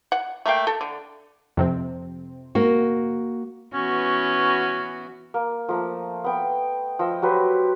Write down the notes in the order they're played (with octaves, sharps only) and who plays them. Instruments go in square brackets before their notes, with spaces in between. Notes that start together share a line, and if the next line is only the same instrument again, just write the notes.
[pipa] F#5
A3 A#3 F5 G5
A4
D3
[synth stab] F2 C3 C4
[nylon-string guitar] A#3 F#4
[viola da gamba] E3 B3 F#4 [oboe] C#4
[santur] A#3
F3 A3 A#3
B3 G5
F3 D#5 E6
F#3 G4 B4 C5